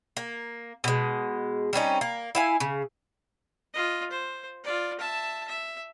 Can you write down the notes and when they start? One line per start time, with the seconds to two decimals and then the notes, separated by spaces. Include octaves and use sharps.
0.17 A#3
0.84 B2 G#3
1.73 G3 C4 C#4 D#4
2.01 A#3
2.35 E4 F5 G#5
2.60 C#3
3.74 F4 D#5
4.11 C5
4.64 F4 D5
4.99 E5 A5
5.48 E5